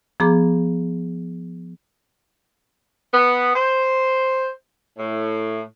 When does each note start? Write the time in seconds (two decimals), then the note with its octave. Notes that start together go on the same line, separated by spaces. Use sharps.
0.20 F3 B3 G#4 A#5 D6
3.13 B3
3.54 C5
4.98 A2